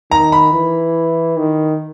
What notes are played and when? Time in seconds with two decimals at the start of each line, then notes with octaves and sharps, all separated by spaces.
0.11 D#3 A#5
0.32 B5
0.53 E3
1.37 D#3